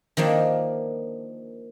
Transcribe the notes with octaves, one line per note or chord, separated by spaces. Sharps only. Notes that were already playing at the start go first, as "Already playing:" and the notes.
D#3 F3 A#3 D4